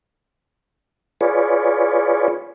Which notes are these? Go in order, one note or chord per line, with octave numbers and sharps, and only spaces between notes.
F4 G#4 B4 C#5 D5